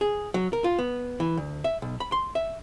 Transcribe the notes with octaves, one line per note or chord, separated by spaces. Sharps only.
G#4
F#3
A#4
F4
B3
E3
D2
E5
B1
B5
C6
E5